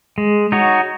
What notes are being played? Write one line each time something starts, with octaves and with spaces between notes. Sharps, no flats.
G#3
D#4 F#4 C#5